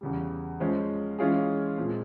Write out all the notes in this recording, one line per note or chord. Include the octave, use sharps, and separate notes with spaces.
E2 C#3 G3
F3 G#3 C#4
E3 G#3 C#4 F4 G#4
A#2 F3 G#3 C4